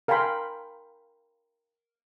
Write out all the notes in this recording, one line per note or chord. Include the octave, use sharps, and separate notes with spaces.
A#4 F5 G5 G#5 B5 C6